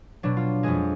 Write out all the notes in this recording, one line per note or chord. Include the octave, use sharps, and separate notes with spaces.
B2 F#3 D4
F4
F2 F3 G#3 G#4